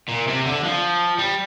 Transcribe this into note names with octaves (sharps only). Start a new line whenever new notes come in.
A#2
C3
D3
F3
G3